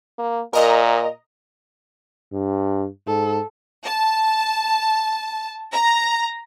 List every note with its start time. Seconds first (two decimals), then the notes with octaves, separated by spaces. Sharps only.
0.19 A#3
0.53 A#2 A#4 D#5 A#5
2.32 G2
3.07 G#2 A4
3.85 A5
5.72 A#5